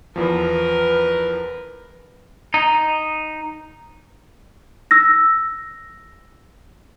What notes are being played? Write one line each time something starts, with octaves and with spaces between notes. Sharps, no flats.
E2 F3 A#4 B4
D#4
E6 A#6